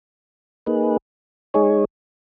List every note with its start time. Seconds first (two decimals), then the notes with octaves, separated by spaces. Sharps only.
0.66 A#3 D#4 G#4 B4
1.54 G#3 D#4 G#4 C#5